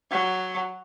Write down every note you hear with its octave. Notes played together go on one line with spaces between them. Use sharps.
F#3